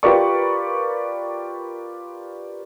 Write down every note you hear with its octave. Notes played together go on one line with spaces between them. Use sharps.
F4 G4 A#4 B4 D5 C#6